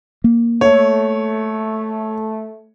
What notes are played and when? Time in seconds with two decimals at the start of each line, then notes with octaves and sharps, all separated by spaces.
0.24 A#3
0.61 A3 C#5